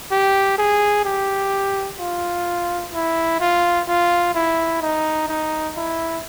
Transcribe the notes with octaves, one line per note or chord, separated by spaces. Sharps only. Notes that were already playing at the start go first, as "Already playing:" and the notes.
G4
G#4
G4
F4
E4
F4
F4
E4
D#4
D#4
E4